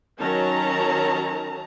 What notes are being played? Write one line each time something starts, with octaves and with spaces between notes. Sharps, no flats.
D#3 F#3 C#4 A5 A#5